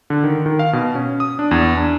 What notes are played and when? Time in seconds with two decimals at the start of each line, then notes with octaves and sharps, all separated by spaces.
0.10 D3
0.24 D#3
0.46 D#3
0.59 F5
0.73 B2
0.95 C#4
1.20 D#6
1.39 D4
1.51 E2
1.77 D4